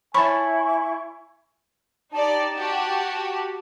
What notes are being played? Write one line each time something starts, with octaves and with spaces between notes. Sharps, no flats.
E4 C#5 G#5 A5 B5 C#6
D#4 G4 D5 A5
F#4 G4